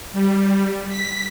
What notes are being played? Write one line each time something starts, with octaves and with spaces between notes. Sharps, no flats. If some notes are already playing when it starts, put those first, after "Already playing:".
G3
B6